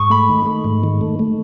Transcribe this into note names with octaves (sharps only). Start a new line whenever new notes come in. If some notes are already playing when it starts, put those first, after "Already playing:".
Already playing: G#2 C#6 D#6
A3 B5
D#3
A3
G#2
D#3
A3
A3